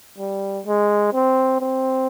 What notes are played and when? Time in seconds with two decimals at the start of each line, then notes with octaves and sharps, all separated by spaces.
0.18 G3
0.66 G#3
1.13 C4
1.61 C4